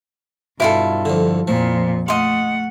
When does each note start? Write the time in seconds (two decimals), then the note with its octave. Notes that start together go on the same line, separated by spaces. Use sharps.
0.60 G2 B2 E4 F4 A4 D5
1.05 F2 D3
1.48 F2 A#2 F3
2.08 A3 F4 D#5 F#5 C6